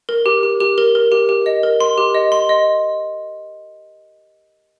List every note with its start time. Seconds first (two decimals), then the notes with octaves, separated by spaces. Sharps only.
0.09 A#4
0.26 G4
0.43 G4
0.60 G4
0.78 A#4
0.95 A#4
1.12 G4
1.29 G4
1.46 D#5
1.63 A#4
1.80 C6
1.98 G4
2.15 D#5
2.32 C6
2.49 D#5